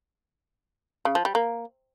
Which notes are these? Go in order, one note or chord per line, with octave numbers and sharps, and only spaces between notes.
C#3
F3
G3
A#3